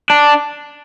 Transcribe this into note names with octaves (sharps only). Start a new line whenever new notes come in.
D4